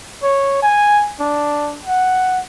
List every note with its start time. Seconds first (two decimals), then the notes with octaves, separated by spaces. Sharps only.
0.23 C#5
0.63 G#5
1.20 D4
1.85 F#5